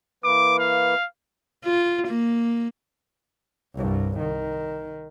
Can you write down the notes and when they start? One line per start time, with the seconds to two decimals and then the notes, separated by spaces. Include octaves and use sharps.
0.24 E3 A#3 B4 D6
0.59 F5
1.64 F4
2.08 A#3
3.74 C2 G2
4.19 D#3